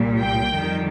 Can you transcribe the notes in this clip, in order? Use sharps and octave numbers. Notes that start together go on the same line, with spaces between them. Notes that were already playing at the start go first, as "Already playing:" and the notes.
Already playing: C2 A#2 G3
G5
F2 D#3 G3